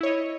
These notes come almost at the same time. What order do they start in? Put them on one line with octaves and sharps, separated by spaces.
E4 C#5 D#5